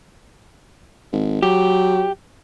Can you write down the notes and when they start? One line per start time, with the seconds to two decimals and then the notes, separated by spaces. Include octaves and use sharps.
1.12 G#1
1.43 F#3 G4